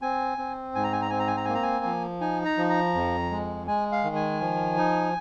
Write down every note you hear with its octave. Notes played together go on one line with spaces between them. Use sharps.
C4 G#5
C4
G#2 G#5
A#5
G#5
A#5
C4 G#5
A#5
G#5
A#5
A#3 G#5
A#5
G#5
F3
D#4 G#5
A#5
F3
A#5
F2
G#3
G#3 G#5
F5
D#3
G#5
F3
D#4